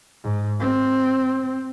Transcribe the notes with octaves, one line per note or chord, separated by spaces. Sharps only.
G#2
C4